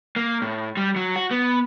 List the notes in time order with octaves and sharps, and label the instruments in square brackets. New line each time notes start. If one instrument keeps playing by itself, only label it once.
[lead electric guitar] A#3
A2
G3
F#3
F#4
B3